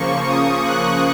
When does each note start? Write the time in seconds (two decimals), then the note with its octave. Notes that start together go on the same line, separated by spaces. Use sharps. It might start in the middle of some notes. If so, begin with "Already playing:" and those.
Already playing: C#3 F3 A#3 C#6
0.26 D#6
0.62 F#6